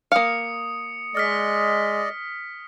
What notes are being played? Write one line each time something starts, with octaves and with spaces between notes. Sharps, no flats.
A#3 F5 D#6 C#7
G#3 D5 D#5 D#6 F6 B6